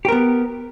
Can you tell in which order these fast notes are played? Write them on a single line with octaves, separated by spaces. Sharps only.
G4 A#4 B3